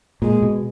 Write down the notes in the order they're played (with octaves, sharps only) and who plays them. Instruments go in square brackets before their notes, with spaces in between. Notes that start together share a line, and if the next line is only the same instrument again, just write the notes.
[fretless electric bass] A#2 [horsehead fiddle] G#3
[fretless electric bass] B2